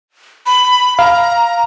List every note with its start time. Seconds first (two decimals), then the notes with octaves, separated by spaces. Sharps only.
0.46 B5
0.99 F5 A#5